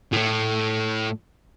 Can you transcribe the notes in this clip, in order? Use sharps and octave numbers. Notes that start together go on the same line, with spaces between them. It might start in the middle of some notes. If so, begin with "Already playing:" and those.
A2 A3